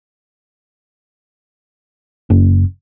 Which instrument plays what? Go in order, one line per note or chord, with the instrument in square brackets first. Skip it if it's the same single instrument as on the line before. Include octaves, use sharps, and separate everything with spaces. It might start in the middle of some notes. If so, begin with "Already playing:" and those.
[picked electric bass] F#1